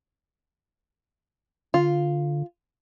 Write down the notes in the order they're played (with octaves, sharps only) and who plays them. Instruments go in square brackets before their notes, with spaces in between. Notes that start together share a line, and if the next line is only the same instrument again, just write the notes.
[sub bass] D3 [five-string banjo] F4